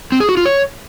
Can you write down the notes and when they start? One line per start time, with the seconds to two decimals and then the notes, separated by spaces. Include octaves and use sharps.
0.12 C4
0.20 G#4
0.29 F#4
0.37 F4
0.45 C#5